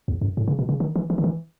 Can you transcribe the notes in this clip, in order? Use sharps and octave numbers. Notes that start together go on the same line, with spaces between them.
E2
F#2
A2
C#3
B2
C#3
D#3
E3
E3
D#3
E3